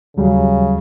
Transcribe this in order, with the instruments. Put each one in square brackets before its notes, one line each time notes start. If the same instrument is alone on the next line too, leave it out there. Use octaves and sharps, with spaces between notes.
[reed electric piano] D#2 F#3 G3 [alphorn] C#3